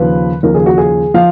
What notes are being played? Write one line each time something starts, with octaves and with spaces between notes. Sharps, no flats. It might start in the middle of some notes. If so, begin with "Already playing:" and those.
Already playing: D#2 C#3 F3 B4
D#2 C#3 F3 A#4
G#4
F#4
G#4
F3 F5